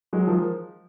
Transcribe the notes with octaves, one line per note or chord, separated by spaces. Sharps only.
F#3 G#3
D#3 F3